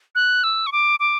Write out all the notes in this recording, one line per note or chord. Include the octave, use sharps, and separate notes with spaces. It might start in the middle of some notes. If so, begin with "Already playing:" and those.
F#6
E6
C#6
D6
D6